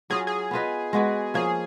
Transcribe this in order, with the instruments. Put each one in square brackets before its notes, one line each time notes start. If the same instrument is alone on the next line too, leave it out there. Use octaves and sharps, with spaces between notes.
[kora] F#3 C#4 F4 [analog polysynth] G#4
[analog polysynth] G#4
[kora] B3 F4 B4 D#5
G#3 B3 F#4 B4
[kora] F3 A#3 C#4 [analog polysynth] G#4